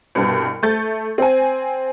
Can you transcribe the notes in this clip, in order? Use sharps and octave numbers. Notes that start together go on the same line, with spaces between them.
C2 G2 B2
A3 G6 A6
C4 G#5